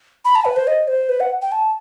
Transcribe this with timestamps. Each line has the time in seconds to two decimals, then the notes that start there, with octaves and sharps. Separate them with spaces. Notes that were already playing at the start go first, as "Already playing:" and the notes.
0.25 B5
0.35 A5
0.45 B4
0.56 C5
0.67 D#5
0.88 C5
1.09 B4
1.20 F#5
1.42 G5
1.52 A5